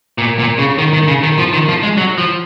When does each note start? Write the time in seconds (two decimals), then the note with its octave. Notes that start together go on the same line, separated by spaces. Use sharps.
0.18 A#2
0.39 A#2
0.58 C#3
0.78 D#3
0.93 D#3
1.08 C#3
1.23 D#3
1.38 F3
1.53 D#3
1.69 F3
1.83 G#3
1.97 F#3
2.18 F3